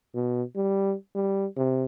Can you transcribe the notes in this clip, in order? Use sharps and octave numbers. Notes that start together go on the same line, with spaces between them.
B2
G3
G3
C3